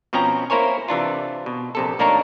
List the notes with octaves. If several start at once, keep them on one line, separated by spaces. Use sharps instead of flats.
B2 F3 C4 C#4 G5 A#5
A#3 E4 A#4 C5 C#5 G#5
C3 E3 D4 F4
B2
A#1 C3 A4
A1 A#3 D4 D#4 A#4 C#5